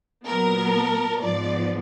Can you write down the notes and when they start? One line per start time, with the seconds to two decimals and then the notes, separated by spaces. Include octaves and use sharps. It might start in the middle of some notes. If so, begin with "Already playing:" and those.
0.25 A#2 F#3 B3 A#4
1.20 G#2 F3 B3 D5